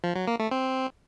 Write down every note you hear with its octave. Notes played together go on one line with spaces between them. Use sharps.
F3
F#3
A#3
A3
C4